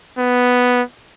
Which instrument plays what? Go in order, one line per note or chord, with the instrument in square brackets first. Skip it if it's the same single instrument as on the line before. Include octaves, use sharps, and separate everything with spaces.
[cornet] B3